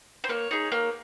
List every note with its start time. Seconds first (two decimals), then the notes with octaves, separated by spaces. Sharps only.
0.24 C5
0.29 A#3 C#5
0.51 D#4 G#4
0.72 A#3